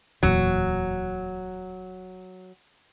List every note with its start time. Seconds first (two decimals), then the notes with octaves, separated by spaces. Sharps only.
0.23 D1 E2 A#2 F#3